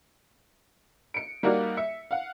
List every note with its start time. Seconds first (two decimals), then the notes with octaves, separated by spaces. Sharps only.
1.14 C#7 D7
1.43 G3 A#3 D#4 F#4 A#4 D5
1.77 E5 C#7
2.11 F5 F#5